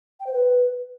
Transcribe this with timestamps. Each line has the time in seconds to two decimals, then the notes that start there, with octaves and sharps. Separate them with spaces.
0.20 G5
0.27 C5
0.33 B4